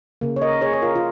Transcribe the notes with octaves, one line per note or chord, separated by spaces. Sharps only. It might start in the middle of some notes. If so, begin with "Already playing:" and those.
C#3 A#3
C#5
A#4 D#5
G#4 C#5
C#5
F4 A#4
F4